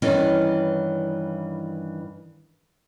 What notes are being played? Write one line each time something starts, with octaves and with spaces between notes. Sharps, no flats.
G2 D#3 E3 C#4